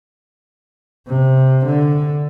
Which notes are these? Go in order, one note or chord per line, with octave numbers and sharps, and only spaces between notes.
C3
D3